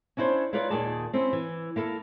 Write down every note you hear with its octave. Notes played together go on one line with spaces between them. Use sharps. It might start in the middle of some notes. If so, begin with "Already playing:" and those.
C#4 D4 E4 F#4 C5 C#5
E4 F4 A#4 B4 C#5 D5
D#2 A#2 D#3 G#4 D5 A5
C4 C#4 E4
E3
A#3 E4 A4 A#4